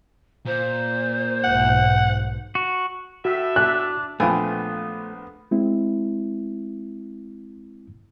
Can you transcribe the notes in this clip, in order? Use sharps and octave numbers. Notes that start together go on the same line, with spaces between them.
A#2 C5
B1 G#2 F#5
F#4
A2 F#4 E5
D4 F#6
A#1 B2 F3 A3 B3 G5 G#5
G#3 C4 E4